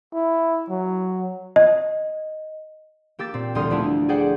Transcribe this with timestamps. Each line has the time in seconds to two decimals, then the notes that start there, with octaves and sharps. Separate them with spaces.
0.14 E4
0.70 F#3
1.56 D#5
3.19 A#3 G4 E6 A6
3.34 A#2 C4
3.55 E1 D2 G3 C6 D#6 F6
3.70 F3 G3 A3 B3 D4 E4
4.09 G#4 C5 D5 F#5 G5